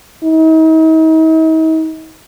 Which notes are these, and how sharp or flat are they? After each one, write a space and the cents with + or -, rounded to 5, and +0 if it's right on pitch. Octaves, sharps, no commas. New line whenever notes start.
D#4 +45